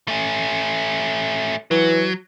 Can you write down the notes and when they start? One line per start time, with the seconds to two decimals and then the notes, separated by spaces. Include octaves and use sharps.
0.08 A3 C#4
1.71 E3 F#3